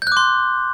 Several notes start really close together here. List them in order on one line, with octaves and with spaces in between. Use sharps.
G6 F#6 D6 C6